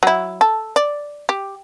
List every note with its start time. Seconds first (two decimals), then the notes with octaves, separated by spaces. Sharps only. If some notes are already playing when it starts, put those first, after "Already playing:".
0.03 F#3 E4
0.41 A4
0.76 D5
1.29 G4